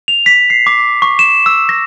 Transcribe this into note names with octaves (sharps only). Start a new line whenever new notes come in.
F7
B6
C7
D6
C#6
E7
E6
A#6